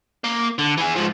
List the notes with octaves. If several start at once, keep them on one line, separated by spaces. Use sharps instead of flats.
A#3
D3
E3 G#4
G#2 F3